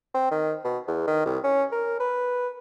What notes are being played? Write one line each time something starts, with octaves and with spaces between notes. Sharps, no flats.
C4
D#3
B2
E2
D#3
C2
C#4
A#4
B4